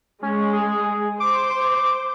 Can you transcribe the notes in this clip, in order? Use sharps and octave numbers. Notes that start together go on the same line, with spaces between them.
G#3 C#4
G#4
C5 D6